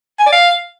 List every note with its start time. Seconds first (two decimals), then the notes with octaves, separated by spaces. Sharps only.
0.19 G#5
0.26 D5
0.33 F5